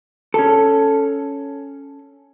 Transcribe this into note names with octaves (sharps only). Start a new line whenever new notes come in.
C#4 A4